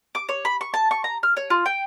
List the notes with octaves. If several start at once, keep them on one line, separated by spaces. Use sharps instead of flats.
D6
C#5
B5
C#6
A5
C#6
A#5
F6
C#5
F4
G5